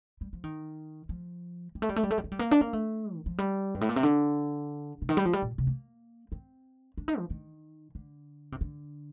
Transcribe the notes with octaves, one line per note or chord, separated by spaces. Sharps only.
G3
F3
D#3
F3
G3
A3
G3
A3
G3
A3
G3
A3
G3
A#3
D4
A#3
A3
D#3
F3
G3
G2
A2
A#2
C3
D3
C3
D#3
G3
F3
G3
A#2
C3
A#3
C4
D4
D#4
F3
D#3
D3
C3
D3